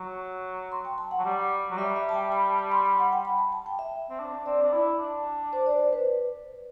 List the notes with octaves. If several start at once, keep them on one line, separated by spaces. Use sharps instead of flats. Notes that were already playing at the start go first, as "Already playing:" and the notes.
Already playing: F#3
C6
G5
A5
F#5
F#3
G3
F#3
G3 E5
E5
A5
G5
B5
A5
B5
C6
B5
F#5
G5
B5
A5
A5
G5
E5
C4
D4
C4 D5
D4
E4
D4
C5
D5
C5
B4